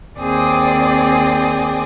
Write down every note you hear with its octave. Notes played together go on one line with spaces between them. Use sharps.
D#2 C4 G#4 D5 G5 D#6